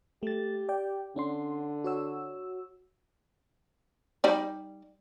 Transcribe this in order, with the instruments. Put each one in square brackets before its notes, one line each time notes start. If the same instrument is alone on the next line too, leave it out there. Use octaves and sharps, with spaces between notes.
[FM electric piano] A3 A6 [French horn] G4
[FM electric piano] D5 G5
[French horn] D3 [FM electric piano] C#4 D4 C6
[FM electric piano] F#4 C#5 E6
[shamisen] G3 D#4 D5